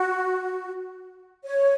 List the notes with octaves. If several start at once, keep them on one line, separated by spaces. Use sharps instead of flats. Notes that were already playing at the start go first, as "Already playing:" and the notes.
Already playing: F#4
C#5